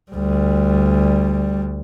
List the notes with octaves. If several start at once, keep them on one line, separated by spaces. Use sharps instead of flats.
D2 G3